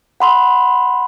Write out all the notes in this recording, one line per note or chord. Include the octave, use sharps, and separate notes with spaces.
F#5 B5 C6